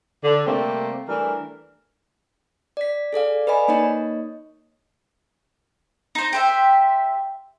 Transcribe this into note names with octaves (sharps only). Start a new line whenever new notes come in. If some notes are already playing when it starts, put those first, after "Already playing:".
D3
C3 G3 A3 A#3 C4
E3 G3 A3 D4 A#4
D5 B6
G#4 A4 D5 F5
B4 D5 D#5 G#5 B5
A#3 D#4 C#5 D#5
D#4 C5
G4 C5 E5